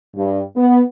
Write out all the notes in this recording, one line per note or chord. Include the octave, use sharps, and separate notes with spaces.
G2
B3